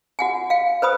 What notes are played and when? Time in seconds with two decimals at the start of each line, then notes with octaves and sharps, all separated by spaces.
0.19 F#4 F#5 G#5
0.50 F5 G5
0.82 B4 C5 B5 D#6